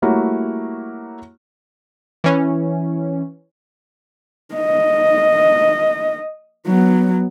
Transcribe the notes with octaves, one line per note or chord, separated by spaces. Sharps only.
G3 A3 A#3 E4 F#4 C#5
E3 C#4
D#5
F#3 B3